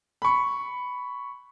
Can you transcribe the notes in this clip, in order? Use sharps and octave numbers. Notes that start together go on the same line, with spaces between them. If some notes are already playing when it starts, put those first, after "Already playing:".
B5 C#6